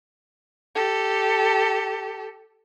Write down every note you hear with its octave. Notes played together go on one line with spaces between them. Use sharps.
G4 A4